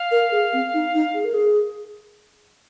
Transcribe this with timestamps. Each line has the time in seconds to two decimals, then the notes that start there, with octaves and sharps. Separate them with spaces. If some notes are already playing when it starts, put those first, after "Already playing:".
Already playing: F5
0.11 A#4
0.32 G#4
0.53 C4
0.74 D#4
0.94 D#4
1.14 G#4
1.24 A#4
1.34 G#4